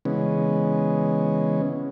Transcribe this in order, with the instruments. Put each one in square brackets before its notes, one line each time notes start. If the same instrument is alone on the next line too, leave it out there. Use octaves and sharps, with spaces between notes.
[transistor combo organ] C#3 E3 G#3 B3 C#4